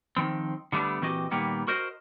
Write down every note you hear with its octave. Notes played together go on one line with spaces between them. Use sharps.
D#3 F3 C4
D3 G3 A3 B3 D4
A#2 E3 C4 F#4 G4 D#5
A#2 D#3 G3 A#3 B3
F#4 A#4 C5 D#5